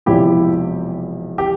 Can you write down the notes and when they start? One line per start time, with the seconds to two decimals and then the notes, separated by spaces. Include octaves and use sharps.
0.06 E1 E2 C3 F3 E4 G4
1.38 G4